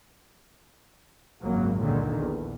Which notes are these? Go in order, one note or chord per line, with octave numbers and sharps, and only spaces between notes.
G#1 C#2 F#2 F#3 A#3
C#2 F#2 A#2 D3 D#3
A#1 E2